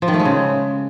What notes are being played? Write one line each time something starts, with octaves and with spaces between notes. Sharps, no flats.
F3
D#3
A3
G#3
C#3